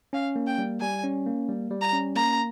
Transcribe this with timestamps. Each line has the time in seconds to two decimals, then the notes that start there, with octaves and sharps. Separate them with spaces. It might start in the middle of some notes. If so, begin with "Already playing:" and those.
0.13 C#4 F5
0.36 A#3
0.47 G5
0.58 G3
0.81 G3 G#5
1.03 C#4
1.26 A#3
1.49 G3
1.71 G3
1.81 A#5
1.93 C#4
2.15 A#3 A#5